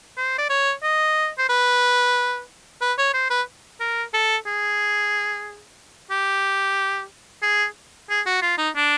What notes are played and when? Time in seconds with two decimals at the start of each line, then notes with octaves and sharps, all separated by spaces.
0.17 C5
0.38 D5
0.49 C#5
0.83 D#5
1.38 C5
1.49 B4
2.81 B4
2.98 C#5
3.14 C5
3.30 B4
3.80 A#4
4.14 A4
4.47 G#4
6.11 G4
7.42 G#4
8.10 G#4
8.26 F#4
8.42 F4
8.58 D#4
8.76 D4